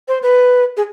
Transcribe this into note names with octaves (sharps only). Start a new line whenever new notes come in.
C5
B4
G#4